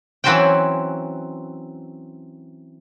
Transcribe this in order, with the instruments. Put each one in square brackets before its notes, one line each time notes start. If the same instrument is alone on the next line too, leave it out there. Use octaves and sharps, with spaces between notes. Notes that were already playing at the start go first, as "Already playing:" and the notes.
[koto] E3 F#3 C4 C#4 E5 G5